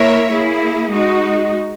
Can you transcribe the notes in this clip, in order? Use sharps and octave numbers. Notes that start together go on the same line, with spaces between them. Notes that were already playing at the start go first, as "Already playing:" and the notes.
Already playing: A#3 E4 A#4 C#5 E5
A#3 E4 G#4
G#3 D#4 F#4